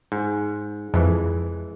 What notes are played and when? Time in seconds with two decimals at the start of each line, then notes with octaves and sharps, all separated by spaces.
0.12 G#2
0.94 F2 E3 G#3